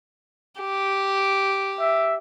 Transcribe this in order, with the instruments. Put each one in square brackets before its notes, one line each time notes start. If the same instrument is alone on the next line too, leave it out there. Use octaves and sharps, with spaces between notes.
[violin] G4
[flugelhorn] E5